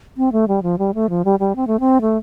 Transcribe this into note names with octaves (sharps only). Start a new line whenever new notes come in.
C4
A3
G3
F3
G3
A3
F3
G3
G3
C4
A3
C4
A3